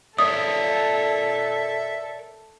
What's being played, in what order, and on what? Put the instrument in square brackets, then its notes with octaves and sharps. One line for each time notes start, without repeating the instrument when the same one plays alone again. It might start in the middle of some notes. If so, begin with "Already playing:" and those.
[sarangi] A4 [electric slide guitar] A#4 C#5 D5 [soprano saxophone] E5 [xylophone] D#6